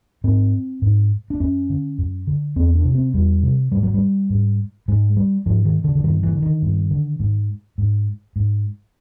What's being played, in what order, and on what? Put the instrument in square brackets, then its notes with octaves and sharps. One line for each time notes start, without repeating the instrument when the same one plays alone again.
[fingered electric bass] G#2 C4
G#2
D4
F#2 C#4
D3
F#2
D3
E2 C4
D4
C3
C4
E2 G3
C3
G#2 G3
F#3
G3
G#2
G#2 G#3
G3
G#2 F3
D#3
D3
D3
G2 D#3
E3
D3
D#3
G2
D3
G#2
G#2
G#2